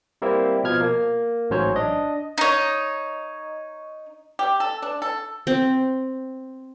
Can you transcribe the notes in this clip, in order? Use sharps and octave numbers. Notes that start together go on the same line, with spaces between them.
G3 A#3 C4 E4
B2 F3 F6 G#6
A#3
A1 G#2 F#3 C#4 C5 C#5
D4 D#5
D#4 C#5
G4
A4
D4
A4
C4